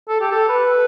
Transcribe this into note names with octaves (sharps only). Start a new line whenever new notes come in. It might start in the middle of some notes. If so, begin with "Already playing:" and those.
A4
G4
A4
B4